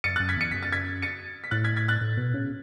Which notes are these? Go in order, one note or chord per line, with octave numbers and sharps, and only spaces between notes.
F#2 A6 C#7
F#2 F#6 A6
G#6 B6
E2 C#7
F#2 B6
A6
G#6 B6
A6 C#7
B6
A2 F#6 A6
G#6 B6
G#6 B6
F#6 A6
A2
B2
C#3